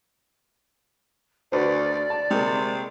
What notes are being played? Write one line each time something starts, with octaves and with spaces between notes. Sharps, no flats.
D2 F#4 B4 C5 D5
A5
C3 G#3 A#3